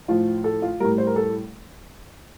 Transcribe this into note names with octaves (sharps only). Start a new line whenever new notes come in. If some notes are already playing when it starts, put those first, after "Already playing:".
A2 F3 F4
A4
F4
A2 G3 A#4
C5
A#4
A4